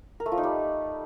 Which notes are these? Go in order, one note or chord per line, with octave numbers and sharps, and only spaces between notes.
A#4
A3
F3
D#4
G3